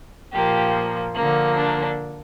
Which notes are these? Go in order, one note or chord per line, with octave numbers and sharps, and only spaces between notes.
A#2 F3 A#3 G4
D3 F3 A#3
D4